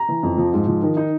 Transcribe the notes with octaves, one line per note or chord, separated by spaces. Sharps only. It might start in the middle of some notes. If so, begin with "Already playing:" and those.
Already playing: A#5
E3
F2
F3
G#2
F3
D#3
D#4